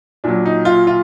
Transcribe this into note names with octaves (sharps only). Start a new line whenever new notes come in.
A#2 F#3 D4
D#4
F4
F4